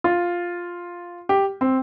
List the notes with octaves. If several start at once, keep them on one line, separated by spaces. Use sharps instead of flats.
F4
G4
C4